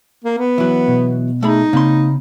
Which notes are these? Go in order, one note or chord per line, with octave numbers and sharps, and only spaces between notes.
A#3
B3
E3 F#3
B2
A3 D#4 G#4 B5
C#3 A#3 C4 B5 C6